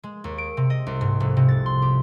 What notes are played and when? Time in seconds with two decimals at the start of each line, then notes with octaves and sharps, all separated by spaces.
0.03 G#3
0.24 D#2
0.38 D7
0.57 C3
0.70 D#5
0.87 C2
1.01 G#2
1.20 F1
1.37 C3
1.49 A6
1.66 C6
1.82 G4